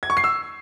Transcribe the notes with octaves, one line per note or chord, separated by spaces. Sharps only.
G#6
C#6
C7
E6